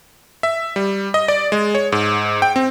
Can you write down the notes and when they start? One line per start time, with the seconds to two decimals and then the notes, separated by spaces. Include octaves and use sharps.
0.43 E5
0.76 G3
1.14 D#5
1.28 D5
1.52 G#3
1.75 C#5
1.92 G#2
2.42 G5
2.56 C4